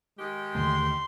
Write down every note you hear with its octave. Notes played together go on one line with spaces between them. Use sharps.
D#3 G#3 G4
D#2 D3 A3 C6